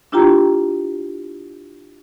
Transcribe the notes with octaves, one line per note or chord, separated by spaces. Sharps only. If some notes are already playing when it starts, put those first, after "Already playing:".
D4 E4 F4 G4 G5 A#5